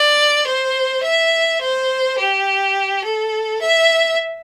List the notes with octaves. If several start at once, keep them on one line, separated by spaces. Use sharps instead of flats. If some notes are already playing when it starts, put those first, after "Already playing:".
Already playing: D5
C5
E5
C5
G4
A4
E5